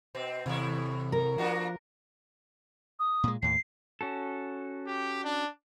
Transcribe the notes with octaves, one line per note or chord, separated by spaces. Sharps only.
B2 C4
D#2 A2 C3 E4
A#4
F3 A#3 D4 F#4
D#6
A#2 G#3
D#2 A2 C7
C#4 F#4 A4
G4
D4